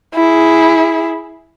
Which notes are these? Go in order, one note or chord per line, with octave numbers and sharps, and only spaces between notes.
E4 G#4